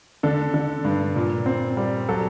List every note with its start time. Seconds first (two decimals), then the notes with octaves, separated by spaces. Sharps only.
0.23 D3 A4
0.54 D3
0.84 G2
1.16 A#2
1.46 C4
1.77 G3
2.09 F#3 A4